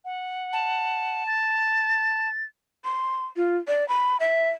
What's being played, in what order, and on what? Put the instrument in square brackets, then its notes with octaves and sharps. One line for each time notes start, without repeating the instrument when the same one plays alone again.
[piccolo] F#5
[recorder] A5
[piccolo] A6
[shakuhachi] C6
F4
D5
B5
E5